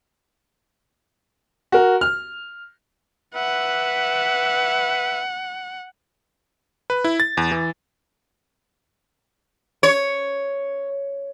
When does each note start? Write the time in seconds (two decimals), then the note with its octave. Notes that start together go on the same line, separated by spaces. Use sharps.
1.72 F#4 A#4
2.01 F6
3.35 B4 E5 F#5
6.90 B4
7.04 E4
7.20 A6
7.37 E2
7.51 E3
9.83 C#5